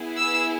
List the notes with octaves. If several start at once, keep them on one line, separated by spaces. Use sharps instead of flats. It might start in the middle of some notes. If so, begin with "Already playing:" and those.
Already playing: B3 E4 G#4
E6